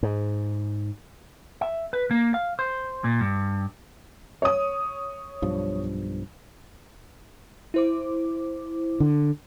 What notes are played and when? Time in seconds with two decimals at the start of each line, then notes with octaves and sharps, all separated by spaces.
0.03 G#2
1.61 E5
1.93 B4
2.11 A#3
2.34 F5
2.59 C5
3.04 A#2
3.21 G2
4.42 C#5 D#6
5.42 B1 G2 F3
7.74 E4 C5 D6
9.00 D3